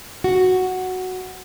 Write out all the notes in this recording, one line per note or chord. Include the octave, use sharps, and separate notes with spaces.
F#4